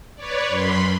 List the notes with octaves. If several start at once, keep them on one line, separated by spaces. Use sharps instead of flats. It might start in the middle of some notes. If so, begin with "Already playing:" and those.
B4 C#5 D5
F#2 B5 C6